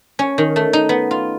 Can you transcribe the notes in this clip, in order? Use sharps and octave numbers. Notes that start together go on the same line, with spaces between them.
C#4
D#3
A3
D#4
B3
F4